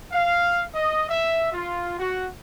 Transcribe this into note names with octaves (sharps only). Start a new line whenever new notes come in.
F5
D#5
E5
F4
F#4